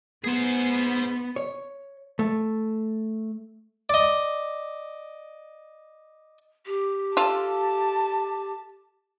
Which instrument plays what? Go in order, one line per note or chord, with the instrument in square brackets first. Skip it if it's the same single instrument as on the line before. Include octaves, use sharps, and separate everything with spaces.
[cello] B3 [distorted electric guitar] G#4 C5
[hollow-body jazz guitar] C#5
A3
[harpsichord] D5 D#5
[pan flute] G4
[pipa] F4 A4 [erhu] A5